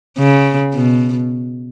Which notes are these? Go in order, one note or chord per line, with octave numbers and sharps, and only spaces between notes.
C#3
B2